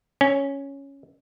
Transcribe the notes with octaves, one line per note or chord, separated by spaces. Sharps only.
C#4